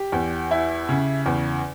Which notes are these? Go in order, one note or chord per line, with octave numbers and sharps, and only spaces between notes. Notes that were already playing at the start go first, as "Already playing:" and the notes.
Already playing: G4
E2
E4
C#3
E2